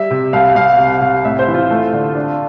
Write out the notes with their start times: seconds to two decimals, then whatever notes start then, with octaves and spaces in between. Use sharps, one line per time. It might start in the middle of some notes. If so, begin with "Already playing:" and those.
Already playing: G3 E5
0.11 C3
0.33 C2 F5
0.55 C2 F5
0.78 C3
1.01 C3
1.25 A2 E5
1.39 C5
1.48 E3
1.54 F4
1.71 A3
1.93 D3
2.15 D4